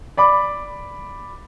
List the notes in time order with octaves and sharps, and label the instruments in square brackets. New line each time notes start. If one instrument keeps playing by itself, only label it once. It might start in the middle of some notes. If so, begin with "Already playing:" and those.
[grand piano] D5 B5 D6